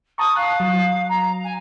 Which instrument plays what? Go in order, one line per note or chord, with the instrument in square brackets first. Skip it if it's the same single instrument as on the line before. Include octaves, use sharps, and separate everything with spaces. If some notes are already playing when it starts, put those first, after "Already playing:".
[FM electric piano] A5 A#5 C#6 [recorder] D#6
[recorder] F5 [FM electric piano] F#6
[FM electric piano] F#3
[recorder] A#5
G#5